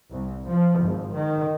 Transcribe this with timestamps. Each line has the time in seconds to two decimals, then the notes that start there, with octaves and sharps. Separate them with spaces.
0.12 C2
0.48 F3
0.80 G#1
1.16 D#3